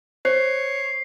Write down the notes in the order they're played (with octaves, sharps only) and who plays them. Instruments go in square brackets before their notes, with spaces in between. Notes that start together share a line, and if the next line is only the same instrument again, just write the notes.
[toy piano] C5 [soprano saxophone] C#5 [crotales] C7